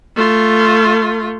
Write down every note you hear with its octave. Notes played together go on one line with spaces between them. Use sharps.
A3 F4